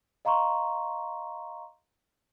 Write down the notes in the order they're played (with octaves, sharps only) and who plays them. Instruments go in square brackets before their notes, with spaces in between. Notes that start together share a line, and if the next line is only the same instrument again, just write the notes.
[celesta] D#5 F5 A#5 C6 C#6